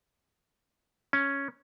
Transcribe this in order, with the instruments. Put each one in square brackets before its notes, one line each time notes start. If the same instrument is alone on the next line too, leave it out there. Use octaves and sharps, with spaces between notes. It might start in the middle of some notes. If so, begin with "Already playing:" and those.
[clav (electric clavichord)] C#4